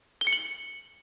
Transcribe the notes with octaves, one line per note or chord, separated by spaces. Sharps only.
G7
C#7
F#7